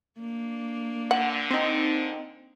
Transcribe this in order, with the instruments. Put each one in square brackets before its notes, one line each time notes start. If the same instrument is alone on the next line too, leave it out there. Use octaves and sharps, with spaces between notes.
[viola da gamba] A#3 D4
[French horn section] A#2 D3 [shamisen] F#5
[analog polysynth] C4 D#4